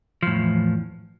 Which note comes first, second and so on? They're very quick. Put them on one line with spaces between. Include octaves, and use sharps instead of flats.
F3 A2 E2